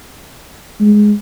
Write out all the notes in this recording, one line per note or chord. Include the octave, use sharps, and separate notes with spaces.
G#3